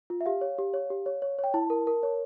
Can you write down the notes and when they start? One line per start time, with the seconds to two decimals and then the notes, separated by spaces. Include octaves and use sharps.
0.10 F4
0.21 E5
0.26 G4 F5
0.41 C#5
0.58 G4
0.74 C#5
0.90 G4
1.06 C#5
1.22 C#5
1.39 C#5
1.44 G5
1.54 E4 A5
1.70 A#4
1.87 A#4
2.03 C#5